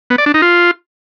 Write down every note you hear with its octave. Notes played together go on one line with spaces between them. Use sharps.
B3
D5
D4
D#4
F4